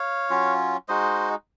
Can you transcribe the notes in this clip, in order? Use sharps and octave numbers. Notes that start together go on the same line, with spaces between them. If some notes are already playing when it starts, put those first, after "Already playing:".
Already playing: C#5 F5
F#3 C#4 F4
G#3 D#4 F#4 C5 D#5